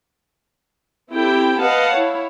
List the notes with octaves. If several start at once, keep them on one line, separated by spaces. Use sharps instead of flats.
C4 E4 G4 A4 G5
B4 D#5 F5 F#5 A5
E4 C#5